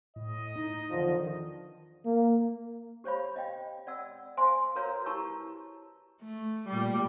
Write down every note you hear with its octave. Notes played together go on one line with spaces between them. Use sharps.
A2 D#5
D#4
E2 D3 D#3 F3
A#3
G4 C5 C#5 F5 B5
D#5 F5 G5
D5 F#5 E6
C5 F5 G#5 C6
F#4 A#4 B4 C#5 F5 A#5
E4 G4 A5 A#5 C#6 E6
A3
A#2 G3